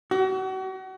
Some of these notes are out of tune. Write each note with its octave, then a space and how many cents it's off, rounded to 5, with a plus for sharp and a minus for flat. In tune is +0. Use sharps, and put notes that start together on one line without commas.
F#4 +35